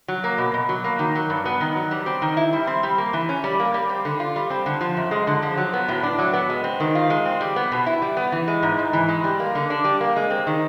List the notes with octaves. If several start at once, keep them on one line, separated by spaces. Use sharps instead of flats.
F#3
A#3
B2
B2
F#3
A#3
D#3
F#3
G2
B3
D#3
F#3
G3
C4
D#3
E4
G3
C4
G3
A#3
E3
C#4
G3
A#3
G3
C4
D3
F4
G3
C4
D3
F3
F#2
G#3
D3
F3
F#3
B3
A2
D4
F#3
B3
G#3
C4
D#3
F4
G#3
C4
G3
B3
B2
E4
G3
B3
E3
G#3
G#2
G#2
E3
G#3
G3
A#3
D3
D4
G3
A#3
G#3
C4
D#3